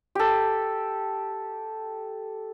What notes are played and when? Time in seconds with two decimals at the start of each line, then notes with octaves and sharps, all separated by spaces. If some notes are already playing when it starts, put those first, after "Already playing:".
0.15 G4 A4